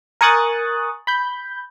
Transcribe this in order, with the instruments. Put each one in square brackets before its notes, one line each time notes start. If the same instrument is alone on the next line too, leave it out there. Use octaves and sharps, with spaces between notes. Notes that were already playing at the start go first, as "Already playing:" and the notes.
[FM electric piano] A#4 G#5 C#6 D#6 F#6 A6
B5 G6